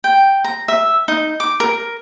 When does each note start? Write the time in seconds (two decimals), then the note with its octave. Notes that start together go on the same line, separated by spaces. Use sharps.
0.04 G5
0.44 A#5
0.68 E5
1.08 D#4
1.40 D6
1.60 A#4